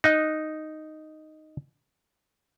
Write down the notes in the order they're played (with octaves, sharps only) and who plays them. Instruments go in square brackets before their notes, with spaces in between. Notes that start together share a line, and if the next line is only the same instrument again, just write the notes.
[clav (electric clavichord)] D#4 [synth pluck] D#5 F#6